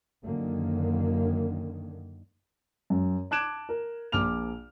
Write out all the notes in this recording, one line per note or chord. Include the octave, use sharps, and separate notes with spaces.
F#2 D3 D#3 A#3
F#2
A5 D6 F#6 G#6 D7 E7
A#4
A#1 D6 F6 F7